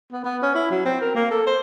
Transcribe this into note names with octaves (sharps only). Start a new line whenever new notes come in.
B3
B3
C#4
E4
F#3
C4
A#4
A#3
A4
C5